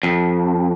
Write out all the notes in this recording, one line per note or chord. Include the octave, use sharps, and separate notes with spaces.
F2